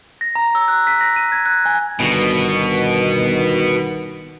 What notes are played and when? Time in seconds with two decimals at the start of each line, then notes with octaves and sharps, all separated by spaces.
0.21 A#6
0.35 A#5
0.55 E6
0.68 F#6
0.87 B6
1.01 A#6
1.16 D#7
1.32 G#6
1.46 F#6
1.65 G#5
2.00 G1 B2 D#3